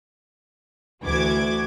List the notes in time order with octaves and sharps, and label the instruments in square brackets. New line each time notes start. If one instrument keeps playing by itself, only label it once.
[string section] D2 E3 F#4 D6 G#6